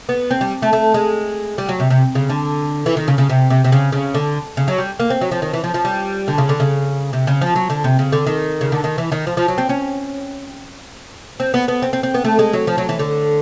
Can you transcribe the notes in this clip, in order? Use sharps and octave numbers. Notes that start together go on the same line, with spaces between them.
B3
C4
G3
A3
A3
G#3
G3
F#3
C3
C3
C#3
D3
E3
D#3
C#3
C#3
C3
C3
C3
C#3
C#3
D3
C#3
F#3
G3
A#3
C4
F#3
F3
D#3
E3
F3
F3
G3
D3
C#3
D3
C#3
C3
C#3
F3
F#3
D3
C3
C#3
D3
D#3
C#3
D3
D#3
E3
D#3
F3
F3
F#3
C4
C#4
C4
B3
B3
C4
C4
C4
B3
A3
G#3
F#3
F3
F#3
E3
D3